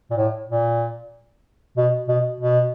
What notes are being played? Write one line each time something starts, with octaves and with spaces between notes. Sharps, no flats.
A#2
A2
A#2
B2
B2
B2